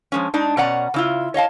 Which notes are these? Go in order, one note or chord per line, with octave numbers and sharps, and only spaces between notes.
F3 G#3 C#4
G#3 D4 D#4
B2 C#4 D5 F#5 A#5
C#3 E4 F4
C#5 D#5 F5 A5